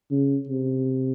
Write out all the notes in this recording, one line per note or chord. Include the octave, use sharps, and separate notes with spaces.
C#3
C3